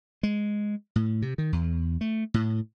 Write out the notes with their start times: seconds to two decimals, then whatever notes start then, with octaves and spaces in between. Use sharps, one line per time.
0.23 G#3
0.96 A2
1.22 C3
1.38 D#3
1.53 E2
2.01 A3
2.34 A2